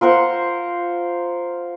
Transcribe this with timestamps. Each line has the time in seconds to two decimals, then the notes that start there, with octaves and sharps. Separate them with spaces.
0.01 F4 A#4 C5 F#5